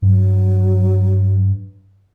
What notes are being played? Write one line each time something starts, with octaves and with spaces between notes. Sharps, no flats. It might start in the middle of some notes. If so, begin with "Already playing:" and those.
G2 F#3